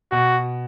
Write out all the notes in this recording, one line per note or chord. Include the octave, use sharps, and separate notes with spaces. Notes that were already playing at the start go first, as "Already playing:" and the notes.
B2 F#4